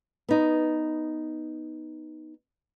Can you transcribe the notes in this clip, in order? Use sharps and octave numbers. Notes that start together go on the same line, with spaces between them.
B3 D#4